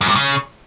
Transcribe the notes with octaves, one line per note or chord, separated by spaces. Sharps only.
F#2
G2
C#3